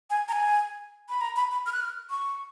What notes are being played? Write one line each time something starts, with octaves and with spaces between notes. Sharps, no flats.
G#5
A#5
G#5
B5
A#5
B5
B5
F6
F#6
F6
C#6